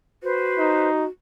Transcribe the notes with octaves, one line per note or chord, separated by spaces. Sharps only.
F#4 B4 C5
D#4